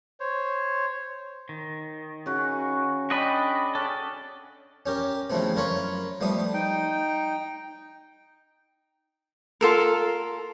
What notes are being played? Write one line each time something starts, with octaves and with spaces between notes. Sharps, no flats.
C5 C#5
D#3
C#3 F#4
D4 F#4 D5 D#5 G5 B5
C#4 A4 D5 F#5
C#4 G4 A#4
C#3 E3 F3 A3 B3 C4
F#2 F4 A#4 C#5 B5 C#6
F3 G3 A3 B3 D#6
D#4 G5
F4 A4 A#4